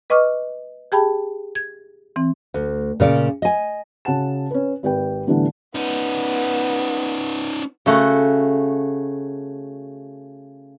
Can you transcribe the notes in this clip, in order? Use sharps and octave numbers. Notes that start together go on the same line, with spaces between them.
B4 D#5 C#6 D6 F6
G4 G#4 G5 A5 B5
G#6
E3 C4
D2
A#2 C#3 D5
D#5 G#5
C#3 F#4 F#5 A5 E7
C#4 B4
G#1 G4 B4 G5
A2 D3 E3 G3 B3 D4
B3 C#4 D#4
C#3 A3 F#4